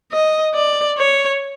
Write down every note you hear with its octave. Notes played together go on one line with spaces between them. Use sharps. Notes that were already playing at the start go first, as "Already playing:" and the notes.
D#5
D5
C#5